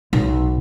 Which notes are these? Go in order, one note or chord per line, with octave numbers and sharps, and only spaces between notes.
B1